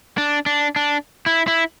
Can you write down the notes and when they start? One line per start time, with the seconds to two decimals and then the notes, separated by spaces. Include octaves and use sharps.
0.18 D4
0.46 D4
0.76 D4
1.26 E4
1.48 E4